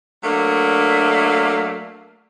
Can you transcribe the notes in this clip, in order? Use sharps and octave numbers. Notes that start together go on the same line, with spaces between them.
F#3 A3 A#3 D4